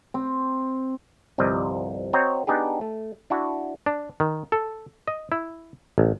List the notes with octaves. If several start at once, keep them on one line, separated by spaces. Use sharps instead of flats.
C4
G1 C2 C3 F3 D5 D#5
C4 F#4 C#5 D#5 A#5
B3 D4 D#4 G4 G#4
A3
D4 E4 F#4
D4
D#3
A4
D#5
E4
A1